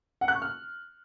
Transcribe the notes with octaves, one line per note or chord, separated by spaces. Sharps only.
F#5
F#6
C#6
F6